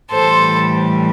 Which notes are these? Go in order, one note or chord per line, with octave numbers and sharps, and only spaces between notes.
A2 E3 G3 A4 C5